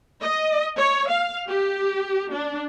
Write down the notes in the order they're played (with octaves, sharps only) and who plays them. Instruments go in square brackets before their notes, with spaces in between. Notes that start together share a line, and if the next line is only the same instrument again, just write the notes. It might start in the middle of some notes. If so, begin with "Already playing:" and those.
[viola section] D#5
C#5
F5
G4
D4